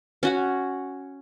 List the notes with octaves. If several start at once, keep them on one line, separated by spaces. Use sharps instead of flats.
C#4 F#4 F#5